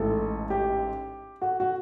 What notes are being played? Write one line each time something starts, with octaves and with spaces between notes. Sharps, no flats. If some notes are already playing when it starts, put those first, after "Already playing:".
Already playing: A1 G#2 E3 A3 A4
G4
F#4
F#4